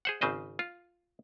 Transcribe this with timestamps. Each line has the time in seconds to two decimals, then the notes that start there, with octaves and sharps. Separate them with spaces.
0.05 G#4 C5 F#5
0.21 G#1 C#3 C4 C5 D#5
0.59 F4